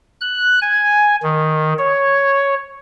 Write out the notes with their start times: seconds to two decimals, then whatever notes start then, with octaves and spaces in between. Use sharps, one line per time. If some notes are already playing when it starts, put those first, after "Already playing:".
0.21 F#6
0.62 G#5
1.23 D#3
1.78 C#5